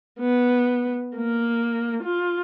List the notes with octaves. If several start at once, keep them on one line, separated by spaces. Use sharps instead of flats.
B3
A#3
F4